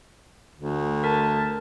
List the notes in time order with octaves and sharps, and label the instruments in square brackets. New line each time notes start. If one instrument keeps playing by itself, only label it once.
[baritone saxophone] D2
[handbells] A#4 [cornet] A5